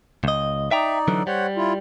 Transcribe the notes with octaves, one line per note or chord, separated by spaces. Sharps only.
C#2 D#5
D#4 D5 E5 G5 A#5
D3 E3 F#3
G3 C5 C#5 F#5
E4 F4